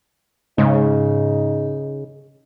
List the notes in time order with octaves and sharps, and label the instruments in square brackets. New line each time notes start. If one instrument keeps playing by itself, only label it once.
[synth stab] G#2 [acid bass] C#3 [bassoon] D#4